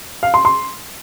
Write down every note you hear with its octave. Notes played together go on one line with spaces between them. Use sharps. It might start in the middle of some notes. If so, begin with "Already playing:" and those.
F5
C6
C6